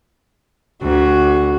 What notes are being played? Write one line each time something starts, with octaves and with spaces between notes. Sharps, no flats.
D2 F#4